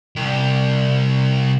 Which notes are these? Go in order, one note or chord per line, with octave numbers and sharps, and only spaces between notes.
C2 G4